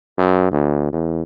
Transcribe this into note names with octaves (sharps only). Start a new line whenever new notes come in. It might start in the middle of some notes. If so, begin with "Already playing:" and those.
F#2
D2
E2